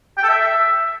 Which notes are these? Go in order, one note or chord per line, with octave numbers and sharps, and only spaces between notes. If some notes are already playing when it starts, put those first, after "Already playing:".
G5
A4
E5